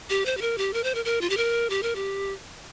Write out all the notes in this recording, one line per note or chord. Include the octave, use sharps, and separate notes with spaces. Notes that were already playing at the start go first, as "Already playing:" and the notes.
G4
C5
G4
A#4
G4
A#4
C5
A#4
A#4
F4
G4
A#4
G4
A#4
G4